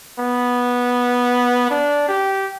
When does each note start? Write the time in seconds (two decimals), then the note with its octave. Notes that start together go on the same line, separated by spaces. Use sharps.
0.19 B3
1.70 D4
2.08 G4